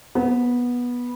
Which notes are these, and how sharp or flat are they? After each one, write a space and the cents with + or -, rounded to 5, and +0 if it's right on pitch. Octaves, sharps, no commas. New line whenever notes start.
B3 -15